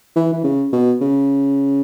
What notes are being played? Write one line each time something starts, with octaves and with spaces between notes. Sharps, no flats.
E3
E3
C#3
B2
C#3